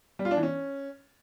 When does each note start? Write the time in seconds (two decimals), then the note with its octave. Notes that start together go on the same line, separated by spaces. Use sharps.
0.19 G3
0.25 F4
0.31 D4
0.37 E3
0.43 C#4